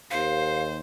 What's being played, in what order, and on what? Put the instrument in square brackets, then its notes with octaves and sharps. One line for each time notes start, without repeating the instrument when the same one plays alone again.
[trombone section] D#2 [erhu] C5 [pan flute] F5